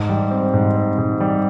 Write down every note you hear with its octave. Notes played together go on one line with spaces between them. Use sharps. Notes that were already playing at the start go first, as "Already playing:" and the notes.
Already playing: G#2
G3
C4
G#2
C4
G#2
G3